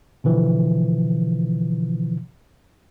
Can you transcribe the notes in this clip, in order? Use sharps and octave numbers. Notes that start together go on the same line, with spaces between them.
B2 D3 E3 F3